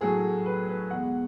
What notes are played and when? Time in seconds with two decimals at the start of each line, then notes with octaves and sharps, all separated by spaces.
0.01 A2 F#3 A3 G#4
0.46 B4
0.69 B4
0.90 E2 B2 G#3 F#5